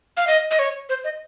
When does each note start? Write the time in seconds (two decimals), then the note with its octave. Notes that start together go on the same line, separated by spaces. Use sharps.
0.17 F5
0.27 D#5
0.51 D#5
0.59 C#5
0.89 C5
1.04 D#5